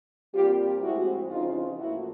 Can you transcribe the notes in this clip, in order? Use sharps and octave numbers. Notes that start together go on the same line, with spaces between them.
A#2 G3 C4 F4 G4
A2 F3 G#3 C4 E4 F#4
F2 C#3 E3 D#4 F4
A2 F3 A#3 E4 F#4